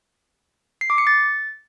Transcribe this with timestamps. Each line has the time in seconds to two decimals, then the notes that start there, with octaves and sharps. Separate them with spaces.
0.81 C7
0.90 D6
0.98 C#7
1.07 A6